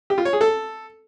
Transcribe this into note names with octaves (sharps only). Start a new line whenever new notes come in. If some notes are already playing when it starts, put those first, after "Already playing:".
G4
F4
C#5
G#4
A4